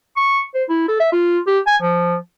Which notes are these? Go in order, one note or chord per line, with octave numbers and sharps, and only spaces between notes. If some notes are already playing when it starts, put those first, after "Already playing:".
C#6
C5
E4
A4
E5
F4
G4
G#5
F3